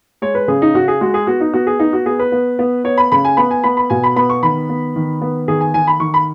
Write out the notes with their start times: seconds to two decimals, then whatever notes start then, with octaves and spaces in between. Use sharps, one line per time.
0.22 G#3 C#5
0.35 B4
0.48 C#3 G#4
0.62 D#4
0.75 C#3 F#4
0.88 G#4
1.01 G#3 F#4
1.14 G#4
1.27 B3 F#4
1.40 D#4
1.54 B3 F#4
1.67 G#4
1.79 B3 D#4
1.93 F#4
2.06 B3 G#4
2.19 B4
2.32 B3
2.59 B3
2.84 B3 C#5
2.98 B5
3.12 C#3 B5
3.25 G#5
3.37 B3 B5
3.51 G#5
3.64 B3 B5
3.77 B5
3.90 B2 G#5
4.03 B5
4.16 B3 B5
4.30 C#6
4.43 D#3 B5
4.69 B3
4.96 D#3
5.22 B3
5.48 D#3 G#4
5.61 G#5
5.74 D#3 G#5
5.87 B5
6.00 D#3 C#6
6.14 B5